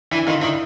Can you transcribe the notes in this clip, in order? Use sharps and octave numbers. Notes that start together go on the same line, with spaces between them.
E3 D4 E4
D#3 D#4 F4
D#3 D4 E4